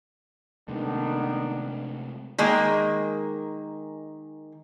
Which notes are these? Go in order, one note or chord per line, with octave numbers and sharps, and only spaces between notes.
C3 D#3 G#3 A3 B3 D4
D#3 G#3 A#3